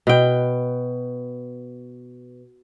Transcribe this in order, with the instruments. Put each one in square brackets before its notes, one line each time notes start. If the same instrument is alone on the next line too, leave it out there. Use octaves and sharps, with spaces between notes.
[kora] B2 G5